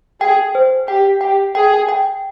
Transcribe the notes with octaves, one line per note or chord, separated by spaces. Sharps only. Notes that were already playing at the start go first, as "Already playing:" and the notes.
G#4 G5
C5
G4 G5
G4 G5
G#4 G5
G5